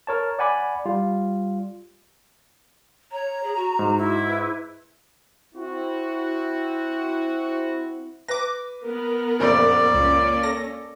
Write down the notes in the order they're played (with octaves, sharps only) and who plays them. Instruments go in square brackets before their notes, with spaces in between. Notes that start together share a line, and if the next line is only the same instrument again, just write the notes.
[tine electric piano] A#4 C#5 A5
D5 F#5 G#5 B5 D6
G3 F4
[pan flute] C#5 [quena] A#5
[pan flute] G#4
F#4
[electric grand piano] G#2
[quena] E4
[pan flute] B4
[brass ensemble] C4 E4 F#4
[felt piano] B4 [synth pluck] D6 A#6
[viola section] B3 A#4
[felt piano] F#1 F2 A#2 [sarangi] D5
[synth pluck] C#2 [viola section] A#3 C#4
[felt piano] A4 [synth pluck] A#6